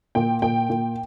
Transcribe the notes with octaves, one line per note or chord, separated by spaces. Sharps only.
A#2 G5
A#2 G5
A#2